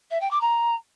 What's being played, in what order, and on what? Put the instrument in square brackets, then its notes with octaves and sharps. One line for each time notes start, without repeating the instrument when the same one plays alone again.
[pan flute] E5
G5
D6
A#5